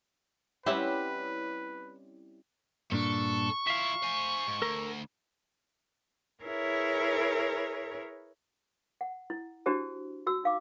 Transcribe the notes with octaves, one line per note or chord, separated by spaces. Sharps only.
G3 C4 C#4 E4 G4 B4 E5 F#5
G2 A#2 D4 A4 C#6
F3 E4 E5 F5
C5 G#5
G#2
D2 A4 A#4
E4 G#4 A#4 B4 C#5
F#5
E4
D4 E4 F#4 G4 C5 A5
F#4 E6
D#4 F5 D6